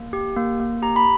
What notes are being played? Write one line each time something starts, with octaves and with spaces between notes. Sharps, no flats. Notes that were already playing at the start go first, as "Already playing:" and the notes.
Already playing: A#3
G4
A#3
A#3
G4 A#5
B5